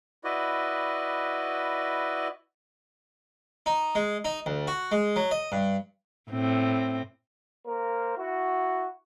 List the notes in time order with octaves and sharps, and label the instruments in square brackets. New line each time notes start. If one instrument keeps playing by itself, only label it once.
[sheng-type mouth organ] E4 F#4 B4 D5 D#5
[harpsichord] D#4
G#3
D#4
D2
F#4
G#3
F#3
D#5
G2
[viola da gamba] A2 C4
[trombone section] A#3 A#4 C5
E4 F#4